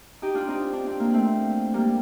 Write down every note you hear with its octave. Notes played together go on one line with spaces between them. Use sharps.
D#4 G4
D4 F4
C4 D#4
D4
C4
A#3
A3 C4
G3 A#3